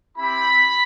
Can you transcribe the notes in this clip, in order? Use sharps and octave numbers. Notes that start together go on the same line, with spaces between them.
C4 E4 G4 B5